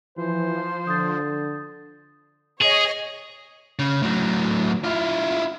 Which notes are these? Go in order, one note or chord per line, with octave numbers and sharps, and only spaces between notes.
E3 F3 C5
D3 D#6 G6 A6
G#4 C#5 D#5
C#3
A2 F#3
E4 F4